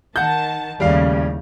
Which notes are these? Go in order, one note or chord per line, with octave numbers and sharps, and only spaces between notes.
D#3 F#5 A5 G6
D#2 A2 C#3 G3 F5